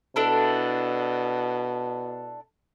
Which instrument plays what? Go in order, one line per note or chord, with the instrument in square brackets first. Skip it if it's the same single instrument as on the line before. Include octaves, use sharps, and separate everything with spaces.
[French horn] B2 [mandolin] D4 E4 A4